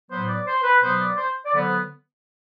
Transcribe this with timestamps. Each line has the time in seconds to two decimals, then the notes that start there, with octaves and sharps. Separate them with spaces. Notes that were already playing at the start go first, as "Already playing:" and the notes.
0.10 A2 F#3 B3 C5
0.28 D5
0.46 C5
0.63 B4
0.82 B2 F#3 B3 C5
0.99 D5
1.16 C5
1.45 D5
1.53 D3 F#3 B3 C5